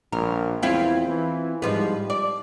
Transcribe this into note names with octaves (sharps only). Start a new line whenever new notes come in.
A#1 A#4
E2 C4 E4 F4
E3
G#2 F3 G3 B4
D5